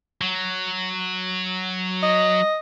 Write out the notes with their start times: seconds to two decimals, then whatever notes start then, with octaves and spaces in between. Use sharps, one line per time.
0.21 F#3
2.03 D#5